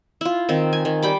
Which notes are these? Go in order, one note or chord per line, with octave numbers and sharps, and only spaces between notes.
E4 F4
D#3 C4
G#5
D#3
G3 G5 B5 D6